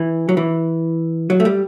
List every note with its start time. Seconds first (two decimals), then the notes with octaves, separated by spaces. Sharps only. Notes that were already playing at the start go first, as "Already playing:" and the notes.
Already playing: E3
0.29 F#3
0.37 E3
1.30 F#3
1.40 A3
1.45 G3